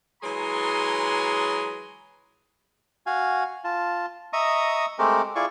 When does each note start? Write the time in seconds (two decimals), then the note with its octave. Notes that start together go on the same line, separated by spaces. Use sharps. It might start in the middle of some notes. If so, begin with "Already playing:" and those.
0.22 E3 F#3 G#3 G#4 A#5 C6
3.06 F#4 F5 G#5
3.64 F4 A5
4.33 D#5 E5 A#5 C#6 D#6
4.99 G#3 A3 C4 G4 A#4
5.35 E4 F4 G#4 D5 C#6